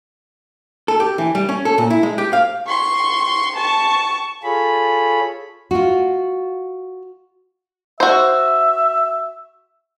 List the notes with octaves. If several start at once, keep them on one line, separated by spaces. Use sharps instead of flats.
A4
G4
E3
G3
C#4
A4
A#2
E4
G#3
G4
F5
C6 C#6
A5 C#6
F4 G#4 A4 C#5 B5
F4 F#4
F#4 C5 E5